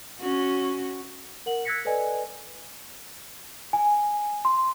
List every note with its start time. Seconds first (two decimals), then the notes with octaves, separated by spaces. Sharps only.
0.20 C#4 F#4
1.46 A#4 F#5 F#7
1.65 E6 F#6 G#6 A#6 B6 C#7
1.85 A4 B4 D5 D#5 G#5
3.73 G#5
4.45 C6